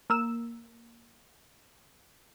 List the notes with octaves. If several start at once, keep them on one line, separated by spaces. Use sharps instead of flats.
A#3 E6 E7